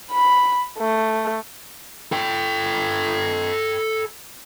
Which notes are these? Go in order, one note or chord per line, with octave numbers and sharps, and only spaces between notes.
B5
A3
A4 G5